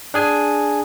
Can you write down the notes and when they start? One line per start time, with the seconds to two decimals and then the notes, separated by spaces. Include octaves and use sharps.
0.14 D4 G#4 G#5